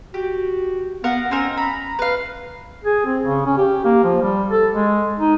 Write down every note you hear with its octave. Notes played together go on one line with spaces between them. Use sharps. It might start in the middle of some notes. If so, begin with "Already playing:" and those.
F#4 G4
B3 A#4 F5 F#5
C4 C#4 D#4 A#4
A#5 B5
B4 F5
G#4
C4
C#3
C#4
G4
A#3
F3
G3
A4
G#3
D#4